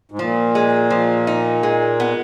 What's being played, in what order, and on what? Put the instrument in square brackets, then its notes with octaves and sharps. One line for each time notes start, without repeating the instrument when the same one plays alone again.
[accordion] G#2
[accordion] A#2 [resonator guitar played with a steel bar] F3
[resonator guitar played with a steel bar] G#3
F3
D#4
G#3
B3